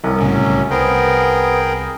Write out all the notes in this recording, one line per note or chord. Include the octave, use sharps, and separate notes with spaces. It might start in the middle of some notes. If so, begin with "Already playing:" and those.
C2 B3 C#4
B1 A2 C#3 F#3 C#4
C2 B3 G#4 A#4 C5 G5